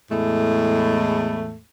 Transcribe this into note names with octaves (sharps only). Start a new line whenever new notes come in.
E2 A2 G#3 A3